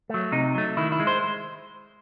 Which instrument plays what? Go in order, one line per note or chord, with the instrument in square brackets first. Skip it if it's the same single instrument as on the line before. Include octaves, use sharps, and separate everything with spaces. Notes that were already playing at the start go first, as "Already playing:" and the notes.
[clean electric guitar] F#3 A3
C3 D#4
F#3 A3
D#3 E4
E4
G#3
C5